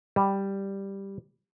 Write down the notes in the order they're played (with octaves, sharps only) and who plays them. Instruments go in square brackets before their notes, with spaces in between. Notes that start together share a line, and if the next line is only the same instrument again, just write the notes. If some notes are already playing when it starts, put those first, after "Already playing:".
[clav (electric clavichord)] G3